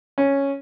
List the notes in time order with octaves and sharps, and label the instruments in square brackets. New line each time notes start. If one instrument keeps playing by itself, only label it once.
[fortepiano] C#4